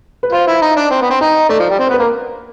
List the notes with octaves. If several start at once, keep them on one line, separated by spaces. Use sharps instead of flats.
B4
F4 C5
E4
D#4
D4
C4
B3
C4
D#4 D#5
A3 D5
F3
G3
C4
B3 C5
B4
A#3 A#4